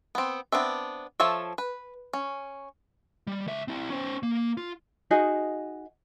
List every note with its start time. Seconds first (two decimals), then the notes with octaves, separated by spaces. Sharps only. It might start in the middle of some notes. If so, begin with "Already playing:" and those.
0.15 B3 C4
0.52 B3 C4 D4 E5
1.20 F3 A4 C#5 E5
1.58 B4
2.13 C#4
3.27 G3
3.47 C#2 E5
3.68 C4 E4
3.90 C#4 C5
4.23 A#3
4.57 F4
5.11 D#4 F#4 G#4 D#5